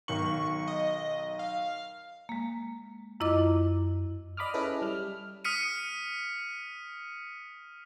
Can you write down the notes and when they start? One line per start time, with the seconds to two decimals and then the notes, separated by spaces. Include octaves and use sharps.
0.08 B1 D#3 C#6 F#7
0.67 D#5
1.39 F5
2.29 G#3 A#3
3.20 F#2 E4 F4 D#5 D6
4.37 D5 D#5 B5 D6 D#6 F6
4.54 C#4 E4 G#4 A4 B4 D#5
4.82 G3 F6
5.44 D#6 F6 B6 C#7 D#7